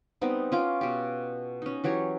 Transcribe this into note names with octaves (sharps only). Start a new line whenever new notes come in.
G3 B3 C4 D#4
C#4 F4 D6
B2 G4
C#4 D#4
E3 F#3 G4 C#5